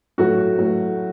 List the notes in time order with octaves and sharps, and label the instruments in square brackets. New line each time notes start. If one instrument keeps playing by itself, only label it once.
[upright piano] A2 F#3 F#4
A2 F#3